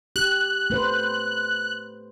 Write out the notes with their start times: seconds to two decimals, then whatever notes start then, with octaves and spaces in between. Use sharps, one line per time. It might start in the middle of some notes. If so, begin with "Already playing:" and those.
0.16 G4 F#6
0.70 A3 B4 C5